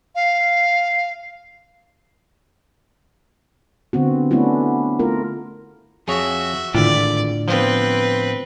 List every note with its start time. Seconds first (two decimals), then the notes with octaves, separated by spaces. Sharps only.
0.15 F5
3.93 D3 B3 C4 F#4
4.31 A3 B3 C#4 D4 E4 F#4
4.99 A3 F4 A#4
6.08 F2 F#4 G#4 C#5 E5
6.74 G#1 A2 D3 E4 F4 D5 G5
7.48 F3 B3 C4 B4